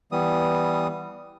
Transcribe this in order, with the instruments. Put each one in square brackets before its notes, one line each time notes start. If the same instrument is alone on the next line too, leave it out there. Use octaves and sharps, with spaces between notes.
[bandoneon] E3 G3 B3 D#6